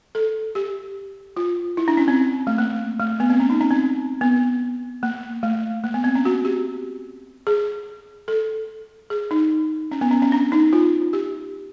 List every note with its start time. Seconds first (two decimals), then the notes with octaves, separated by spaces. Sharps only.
0.15 A4
0.55 G4
1.37 F4
1.77 E4
1.88 D4
1.97 C#4
2.08 C4
2.47 A3
2.58 A#3
2.99 A3
3.20 B3
3.30 C4
3.40 C#4
3.50 D#4
3.61 C#4
3.71 C4
4.21 B3
5.03 A#3
5.43 A3
5.84 A#3
5.94 B3
6.04 C4
6.15 C#4
6.25 F#4
6.45 G4
7.47 G#4
8.28 A4
9.10 G#4
9.31 D#4
9.92 C#4
10.01 B3
10.11 C#4
10.22 C#4
10.32 D4
10.52 D#4
10.73 F4
11.13 G4